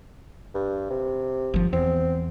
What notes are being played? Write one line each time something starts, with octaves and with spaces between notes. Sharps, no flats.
G2
C3
G1 F3
E2 C4